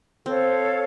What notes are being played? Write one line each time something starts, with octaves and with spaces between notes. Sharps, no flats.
C4 A4 C#5 F5